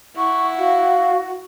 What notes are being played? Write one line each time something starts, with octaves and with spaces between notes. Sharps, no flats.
E4 F#5 C#6
F#4 F5